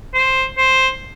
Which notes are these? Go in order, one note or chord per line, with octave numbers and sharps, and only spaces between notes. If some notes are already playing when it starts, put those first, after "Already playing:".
C5
C5